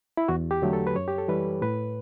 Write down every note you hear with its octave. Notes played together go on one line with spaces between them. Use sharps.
E4
E2 F#4
G4
D3 F#3 A3
A4
B4
F#2 C#5
G4
A4
E3 G3 B4
A2 B4